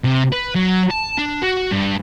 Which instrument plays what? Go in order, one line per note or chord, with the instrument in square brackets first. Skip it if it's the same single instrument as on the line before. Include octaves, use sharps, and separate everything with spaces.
[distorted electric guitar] C3
B4
F#3
A5
D4
F#4
G2